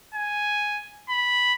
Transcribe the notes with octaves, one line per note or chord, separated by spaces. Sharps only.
G#5
B5